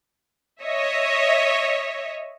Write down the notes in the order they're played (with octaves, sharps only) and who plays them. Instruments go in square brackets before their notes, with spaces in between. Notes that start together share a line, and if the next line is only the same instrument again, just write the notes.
[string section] C#5 D#5 E5